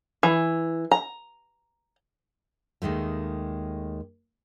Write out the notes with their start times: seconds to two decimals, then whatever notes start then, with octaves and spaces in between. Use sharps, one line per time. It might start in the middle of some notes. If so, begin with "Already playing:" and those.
0.23 E3
0.91 A#5
2.82 D#2 D#3 G#3 A3